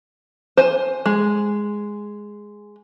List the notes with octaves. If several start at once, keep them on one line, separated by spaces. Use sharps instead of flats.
C5 G#5
G#3